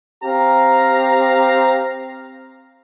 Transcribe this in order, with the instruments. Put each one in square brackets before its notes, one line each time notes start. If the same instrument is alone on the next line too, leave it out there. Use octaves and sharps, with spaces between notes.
[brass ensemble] C4 G4 F5 A#5